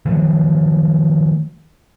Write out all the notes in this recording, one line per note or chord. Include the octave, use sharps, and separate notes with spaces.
D#3 F3 F#3 A3